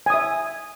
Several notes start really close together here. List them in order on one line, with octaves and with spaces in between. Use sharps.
G#5 D#6 E5